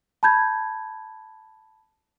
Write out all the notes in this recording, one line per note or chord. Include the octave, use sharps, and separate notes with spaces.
A5 B5 G6 G#6